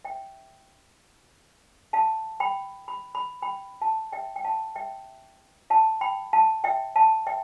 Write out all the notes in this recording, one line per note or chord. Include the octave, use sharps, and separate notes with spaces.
E5 G5
F5 A5
G5 B5
B5
B5
G5 B5
F5 A5
E5 G5
G5
F5 A5
E5 G5
F5 A5
G5 B5
F5 A5
E5 G5
F5 A5
E5 G5